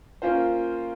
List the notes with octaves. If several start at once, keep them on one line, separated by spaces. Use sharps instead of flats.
A#3 C#4 F4 C5